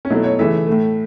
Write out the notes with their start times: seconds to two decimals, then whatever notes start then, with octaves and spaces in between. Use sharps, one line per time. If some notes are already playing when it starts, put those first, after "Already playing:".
0.05 C#4
0.10 B2 F#3 A3 E4
0.24 C#5
0.39 C#3 E3 A3 E5
0.67 A2 A3